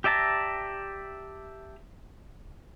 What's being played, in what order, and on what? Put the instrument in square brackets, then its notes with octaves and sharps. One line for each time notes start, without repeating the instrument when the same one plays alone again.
[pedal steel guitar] G4 D5 E5 A5 A#5